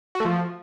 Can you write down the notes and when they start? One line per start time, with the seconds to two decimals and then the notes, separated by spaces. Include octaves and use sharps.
0.15 F#4
0.20 A3
0.25 F3